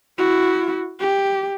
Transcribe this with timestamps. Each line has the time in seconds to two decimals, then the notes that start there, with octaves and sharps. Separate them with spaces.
0.18 E4 F#4
1.00 G4